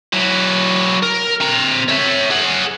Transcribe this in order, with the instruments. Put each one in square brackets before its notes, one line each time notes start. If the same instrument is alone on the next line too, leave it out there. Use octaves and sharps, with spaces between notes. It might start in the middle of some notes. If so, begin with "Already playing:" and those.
[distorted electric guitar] F#3 E4
A#4
C4 A#5
C#5 E5
G#4 F#5